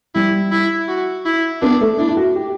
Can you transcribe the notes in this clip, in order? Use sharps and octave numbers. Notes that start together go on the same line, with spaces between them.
G3 E4
E4
F#4
E4
B3 D4
A3
D4 E4
E4
F#4
G4